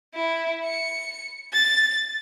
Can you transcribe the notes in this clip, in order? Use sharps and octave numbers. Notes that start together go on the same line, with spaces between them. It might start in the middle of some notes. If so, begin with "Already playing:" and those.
E4
C#7
A6